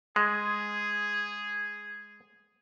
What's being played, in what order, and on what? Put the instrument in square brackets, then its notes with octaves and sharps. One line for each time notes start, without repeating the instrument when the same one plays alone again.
[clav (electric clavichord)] G#3 [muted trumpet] G#4